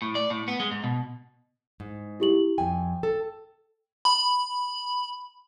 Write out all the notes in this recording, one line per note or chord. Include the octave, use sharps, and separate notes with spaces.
A2
D5
A2
B3
G#3
G#2
B2
G#2
E4 G4 F#7
F2 G5 G#5
A4
B5